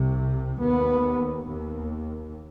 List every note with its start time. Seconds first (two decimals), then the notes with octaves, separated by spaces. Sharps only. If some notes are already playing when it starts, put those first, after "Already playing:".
Already playing: C2 C3
0.59 D#2 B3
1.48 D#2